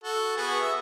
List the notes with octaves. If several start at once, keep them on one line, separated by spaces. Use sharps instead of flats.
F#4 A4
B3 F#4 G#4
E5